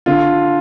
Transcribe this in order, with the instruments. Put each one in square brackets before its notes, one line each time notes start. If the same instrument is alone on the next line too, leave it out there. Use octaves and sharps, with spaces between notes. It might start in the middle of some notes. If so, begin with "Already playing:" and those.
[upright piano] D3 [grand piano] F4